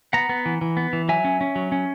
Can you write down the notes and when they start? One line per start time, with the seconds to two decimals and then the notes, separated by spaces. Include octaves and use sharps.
0.13 B3 F#5 A#5
0.29 B3
0.46 E3
0.61 E3
0.77 B3
0.93 E3
1.09 F#3 E5 G#5
1.24 C#4
1.41 C#4
1.56 F#3
1.72 C#4